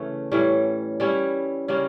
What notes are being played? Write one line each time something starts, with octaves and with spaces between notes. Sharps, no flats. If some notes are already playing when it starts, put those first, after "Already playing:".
Already playing: C#3 E3 A3 C#4
A2 E3 G3 C#4
G3 C#4 E4
C#3 G3 A#3 C#4